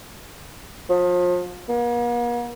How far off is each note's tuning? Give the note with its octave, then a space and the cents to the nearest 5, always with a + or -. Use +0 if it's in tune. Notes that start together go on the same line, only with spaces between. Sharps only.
F3 +35
A#3 +45